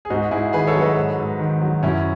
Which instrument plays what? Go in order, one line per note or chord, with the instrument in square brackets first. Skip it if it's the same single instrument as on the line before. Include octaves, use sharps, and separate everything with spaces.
[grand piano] G#4
G#2 D#4 F#4
G#2 E4 G#4
D#3 G#4 B4
A4 C#5
F#3
B4 D#5
G#2
G#2
D#3
F#3
F#2 C#4 E4